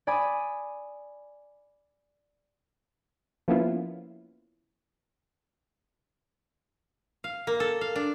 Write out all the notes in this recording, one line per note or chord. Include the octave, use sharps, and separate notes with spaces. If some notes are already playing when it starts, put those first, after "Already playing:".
D5 G#5 B5 D#6
F3 A#3 B3 C#4 E4 F4
F5
A#3
A4
F5
D4